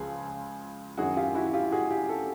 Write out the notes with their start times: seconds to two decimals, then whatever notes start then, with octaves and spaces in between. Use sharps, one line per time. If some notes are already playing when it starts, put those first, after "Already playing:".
Already playing: C#2 C#3 F3 G#4
0.98 F#2 D#3 F#4 G#4
1.17 F4 G4
1.35 E4 F#4
1.53 F4 G4
1.72 F#4 G#4
1.90 F4 G4
2.09 G4 A4